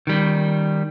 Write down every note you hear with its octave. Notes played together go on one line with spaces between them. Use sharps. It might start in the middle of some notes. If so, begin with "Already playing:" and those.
D#3 G3